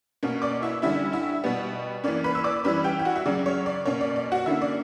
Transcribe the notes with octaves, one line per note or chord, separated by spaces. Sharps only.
B2 A#3 C#4
D5 D6
E4 E5
D3 G3 C#4 E4 E5
E4 E5
B2 G3 B3
E3 A#3 C#4 D5
B4 B5
E6
D5 D6
E3 G3 C#4 B4 B5
G4 G5
G5
F#4 F#5
E5
C#3 F#3 C#4 D5
C#5
D5
B2 A#3 C#4 C#5
D5
D5
F#4 F#5
D3 A#3 C#4 E4 E5
D5